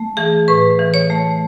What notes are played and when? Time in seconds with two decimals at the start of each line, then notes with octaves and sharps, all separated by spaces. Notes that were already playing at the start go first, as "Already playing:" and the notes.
Already playing: A3
0.17 E3 G#4
0.48 A2 B4
0.79 E3
0.94 C#5
1.10 A3